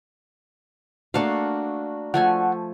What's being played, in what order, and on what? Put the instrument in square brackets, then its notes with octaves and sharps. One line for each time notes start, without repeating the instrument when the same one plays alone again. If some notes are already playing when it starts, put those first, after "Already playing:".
[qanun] A3 F5 [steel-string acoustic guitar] A#3 D4 F#4
[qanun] F3 A3 G#5 [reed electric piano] F#5